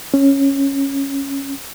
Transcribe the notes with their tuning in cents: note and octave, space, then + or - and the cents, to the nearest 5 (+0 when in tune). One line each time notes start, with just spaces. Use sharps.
C#4 -10